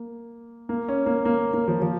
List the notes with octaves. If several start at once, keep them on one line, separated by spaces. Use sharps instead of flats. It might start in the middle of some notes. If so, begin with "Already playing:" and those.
Already playing: A#3
A#3
C#4
A#3
A#3
A#3
F3
F3